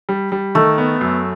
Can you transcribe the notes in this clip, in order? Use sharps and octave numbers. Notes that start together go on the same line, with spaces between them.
G3
G3
D#3 A3
B3
F#2